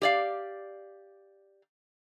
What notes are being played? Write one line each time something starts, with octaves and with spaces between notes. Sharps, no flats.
G4 D5 F5